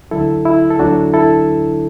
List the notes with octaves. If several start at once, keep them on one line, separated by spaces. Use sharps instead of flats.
D2 D3 F#3 E4 A4
E4
A4
D2 D3 F#3 D4 F#4
E4 A4